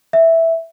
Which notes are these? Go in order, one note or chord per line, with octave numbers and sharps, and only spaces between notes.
E5